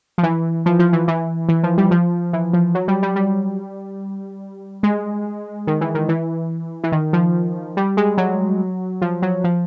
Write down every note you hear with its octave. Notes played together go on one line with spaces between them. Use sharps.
F3
E3
F3
F3
E3
E3
E3
F3
G3
F3
E3
F3
F#3
G3
G3
G3
G#3
D#3
E3
D#3
E3
E3
D#3
F3
G3
G#3
F#3
F3
F#3
F3